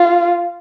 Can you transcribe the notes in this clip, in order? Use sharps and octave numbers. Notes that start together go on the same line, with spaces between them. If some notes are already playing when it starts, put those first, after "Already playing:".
Already playing: F4